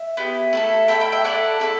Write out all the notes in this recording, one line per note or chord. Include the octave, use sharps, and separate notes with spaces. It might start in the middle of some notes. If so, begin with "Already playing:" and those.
Already playing: E5
B3 E4 G4
A3 E4 A4
A3 E4 A4 G5 B5
G5 B5
E5 G5
A3 E4 A4 D5 F#5
A3 E4 A4